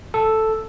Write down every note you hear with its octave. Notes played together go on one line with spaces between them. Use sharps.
A4